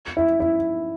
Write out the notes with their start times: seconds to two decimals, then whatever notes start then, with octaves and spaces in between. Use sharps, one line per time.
0.17 E4
0.40 E4